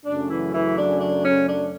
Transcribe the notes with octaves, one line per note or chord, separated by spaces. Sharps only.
F#2 C#3 F#3 A3 C#4 D4
E3 E4
E3 E4
D4
D4
C#4
D4